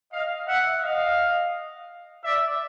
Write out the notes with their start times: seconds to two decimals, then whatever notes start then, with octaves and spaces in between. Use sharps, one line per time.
0.13 D#5 F5
0.47 E5 F#5
0.83 D#5 F5
2.23 D5 E5